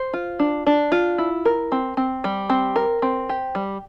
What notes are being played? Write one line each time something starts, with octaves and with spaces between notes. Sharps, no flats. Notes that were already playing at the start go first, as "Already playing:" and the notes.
Already playing: C5
F4
D4
D4
F4
E4
A#4
C4
C4
G3
C4
A#4
C4
G4
G3